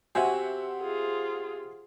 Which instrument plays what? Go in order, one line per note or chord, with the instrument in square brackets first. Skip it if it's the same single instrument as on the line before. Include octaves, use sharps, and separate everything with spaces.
[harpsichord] C3 [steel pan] F#4 G#5 [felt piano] C5 E5 F#5
[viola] F4 G#4